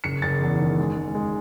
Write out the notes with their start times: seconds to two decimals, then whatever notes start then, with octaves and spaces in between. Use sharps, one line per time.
0.04 F#1 C#7
0.22 F#1 A6
0.41 E2
0.60 D#3
0.78 G#3
0.97 G#3
1.15 G#3